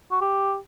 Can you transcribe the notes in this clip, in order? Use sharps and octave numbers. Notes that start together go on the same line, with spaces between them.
F#4
G4